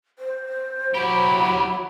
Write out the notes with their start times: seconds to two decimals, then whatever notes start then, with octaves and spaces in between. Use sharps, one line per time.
0.19 C5
0.94 F#3 E4 G4 B5